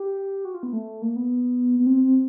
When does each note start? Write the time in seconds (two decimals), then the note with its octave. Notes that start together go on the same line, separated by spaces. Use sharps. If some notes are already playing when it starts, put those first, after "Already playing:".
Already playing: G4
0.45 F#4
0.54 F4
0.63 B3
0.73 A3
1.02 A#3
1.16 B3
1.79 B3
1.86 C4
2.04 C4